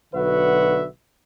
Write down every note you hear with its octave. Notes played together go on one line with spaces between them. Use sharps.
B1 D3 F#4 B4 E5 F#5